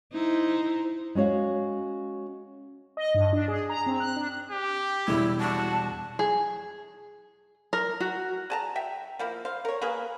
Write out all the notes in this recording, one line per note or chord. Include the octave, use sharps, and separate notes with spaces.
D#4 E4 C5
G#3 C#4 F#4 C#5 F5
D#5
G2
D4
G#4
A#5
C4
F#6
D4
G4
E1 G3 E4
F#4 A5
G#4
A#4
F#4
G#4 A5 A#5
E5 G5
F3 A#3 E4
C5 F5
A#4 C#5
A#3 G#4 A#4 B4